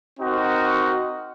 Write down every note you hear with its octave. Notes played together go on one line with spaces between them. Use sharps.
C4 D#4 F#4 A#4